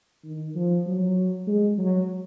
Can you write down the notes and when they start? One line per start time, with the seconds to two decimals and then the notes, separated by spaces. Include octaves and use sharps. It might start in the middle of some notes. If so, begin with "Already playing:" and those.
0.24 D#3
0.55 F3
0.87 F#3
1.47 G#3
1.78 F#3